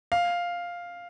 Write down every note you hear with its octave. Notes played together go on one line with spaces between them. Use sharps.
F5